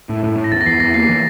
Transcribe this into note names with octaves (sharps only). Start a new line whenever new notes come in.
A2
A2
A2
A#6
E2 A6
A#6
E2 C7
E2 A#6
A#3 C7
E3